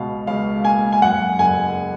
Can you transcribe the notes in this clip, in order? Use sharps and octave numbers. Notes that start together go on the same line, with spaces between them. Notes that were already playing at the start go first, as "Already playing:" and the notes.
Already playing: C#2 B2 F5
C#2 F5
A#3 G#5
G#5
F#2 F#5
F#1 G#5